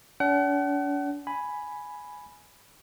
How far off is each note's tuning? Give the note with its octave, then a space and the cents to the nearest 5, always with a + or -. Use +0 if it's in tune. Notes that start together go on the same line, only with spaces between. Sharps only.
D4 -45 F#5 +40
G#5 +5 B5 +0